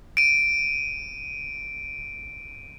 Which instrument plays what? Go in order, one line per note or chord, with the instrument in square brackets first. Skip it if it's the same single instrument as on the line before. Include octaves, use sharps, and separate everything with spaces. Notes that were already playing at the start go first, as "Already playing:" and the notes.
[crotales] D7 D#7